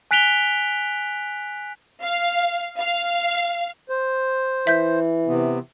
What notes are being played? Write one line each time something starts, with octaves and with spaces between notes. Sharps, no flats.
G#5 F#6 B6 D7 F7 G7
F5
F5
C5
E3 E5 G6
C3 B3